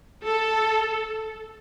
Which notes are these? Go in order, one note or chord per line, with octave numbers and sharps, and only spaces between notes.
A4